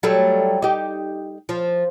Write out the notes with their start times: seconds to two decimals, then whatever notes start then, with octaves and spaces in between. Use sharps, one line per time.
0.03 F#3 G3 A3
0.62 D#4 G4
1.49 F3